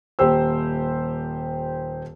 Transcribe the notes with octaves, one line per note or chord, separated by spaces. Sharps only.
D#1 G4 C5 E6